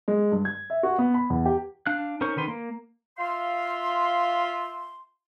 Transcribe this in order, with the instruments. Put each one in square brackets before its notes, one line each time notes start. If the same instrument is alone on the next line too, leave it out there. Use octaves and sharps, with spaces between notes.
[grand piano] G#3
G2
G#6
E5
F#4
B3
B5
E2
G4
[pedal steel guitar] D4 F5 F#6
C#4 D#4 A#4 C5 C#6
D3 D#3 B4 C6
A#3
[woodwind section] F4 E5 F5 C6